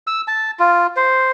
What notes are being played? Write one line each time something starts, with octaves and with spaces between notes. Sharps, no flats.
E6
A5
F4
C5